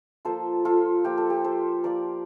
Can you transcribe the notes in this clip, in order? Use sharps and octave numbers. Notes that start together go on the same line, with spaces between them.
F3 A#3 F4 A4 C5
F4 A4
F3 A#3 F4 G4
A4
G4
A4 C5
F3 A#3 F4 A#4 D5